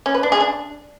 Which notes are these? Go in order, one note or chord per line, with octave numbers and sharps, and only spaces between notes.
C#4
B4
D4
G#4
D4